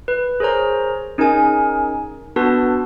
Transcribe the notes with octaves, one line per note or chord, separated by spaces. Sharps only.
B4
G#4 A#4 C5 C#5 A#5
C#4 D#4 G#4 A#4 G#5
B3 D4 F#4 A4 B4 A5